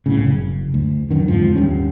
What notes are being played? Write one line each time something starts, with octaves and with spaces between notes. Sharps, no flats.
C2 A2 C#3
F#1
D2
F#2 D3 D#3
F2 G#2 D3 F3
D#1 G3 C#4